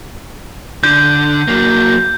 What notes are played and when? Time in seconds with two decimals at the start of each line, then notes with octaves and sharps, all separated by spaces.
0.84 D3 G6
1.48 F#3 A#3